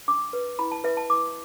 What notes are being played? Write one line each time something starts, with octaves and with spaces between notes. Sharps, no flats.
D4 D6
B4
E4 B5
A5
B4 E5
A5
E4 D6